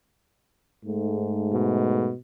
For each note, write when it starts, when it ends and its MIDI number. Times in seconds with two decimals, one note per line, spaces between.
0.85 2.10 44
0.85 2.10 57
1.52 2.16 47